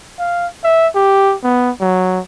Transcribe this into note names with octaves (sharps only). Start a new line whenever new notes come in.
F5
E5
G4
B3
F#3